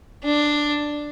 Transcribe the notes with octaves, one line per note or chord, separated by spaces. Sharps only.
D4